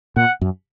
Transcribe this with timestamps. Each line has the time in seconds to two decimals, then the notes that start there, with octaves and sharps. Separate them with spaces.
0.16 A#2 F#5
0.41 F#2